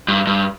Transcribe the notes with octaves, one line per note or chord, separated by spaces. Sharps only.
G2
G2